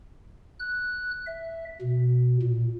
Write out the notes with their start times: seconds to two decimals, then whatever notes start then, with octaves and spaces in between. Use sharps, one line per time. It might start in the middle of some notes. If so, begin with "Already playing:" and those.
0.59 F#6
1.27 E5
1.81 B2
2.42 A#2